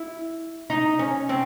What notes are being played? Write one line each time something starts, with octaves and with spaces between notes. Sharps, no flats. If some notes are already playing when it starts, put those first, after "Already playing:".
Already playing: E4
D#4
C#4
C4